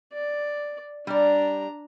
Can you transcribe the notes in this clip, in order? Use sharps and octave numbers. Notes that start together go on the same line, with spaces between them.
D5
G3 D4 D5 A#5